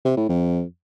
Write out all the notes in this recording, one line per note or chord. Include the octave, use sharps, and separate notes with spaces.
C3
A2
F2